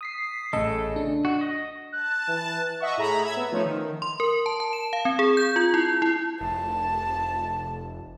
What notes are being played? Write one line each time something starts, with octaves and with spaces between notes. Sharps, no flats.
D#6 B6 C7
A1 C#3 A3 A4 D#5
D4
F#4
D#5
A5 F#6
E3
D#5 E5 F#5 C#6
A2 G#4 A#5 B5
E5 G#6
B3
F3 A3 C#4 D#4
D#3
C6
A#4
A5
A5
E7
F5
C4
G#4
G6
F4
E4
E4
F1 A5